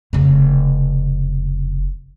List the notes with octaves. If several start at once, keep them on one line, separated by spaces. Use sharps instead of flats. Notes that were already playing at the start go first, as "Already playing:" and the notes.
F1 C#3